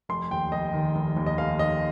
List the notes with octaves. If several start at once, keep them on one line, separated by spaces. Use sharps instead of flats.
F1 C6
D#2 G5
F1 D#5
D#3
F1
D#2
D#5
F1 F5
D#3 D#5